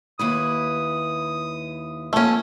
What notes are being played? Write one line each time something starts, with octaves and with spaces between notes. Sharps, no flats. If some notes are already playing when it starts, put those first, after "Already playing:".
D#2 E4 B4 D#6
F2 A3 A#3 C#4